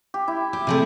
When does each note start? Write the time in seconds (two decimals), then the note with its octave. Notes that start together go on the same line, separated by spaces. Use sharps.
0.14 G4
0.28 E4
0.53 G4
0.67 C3 G#3 A3